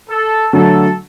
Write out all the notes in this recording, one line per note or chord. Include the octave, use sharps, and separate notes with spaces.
A4
D3 F#3 A3 A4